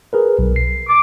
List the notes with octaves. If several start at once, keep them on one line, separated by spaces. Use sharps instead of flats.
G#4 A#4 B4
B1
C7
D6